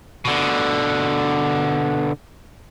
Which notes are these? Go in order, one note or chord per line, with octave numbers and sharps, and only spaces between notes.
B2 D3